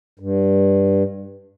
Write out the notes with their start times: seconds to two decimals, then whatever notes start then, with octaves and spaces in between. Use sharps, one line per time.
0.19 G2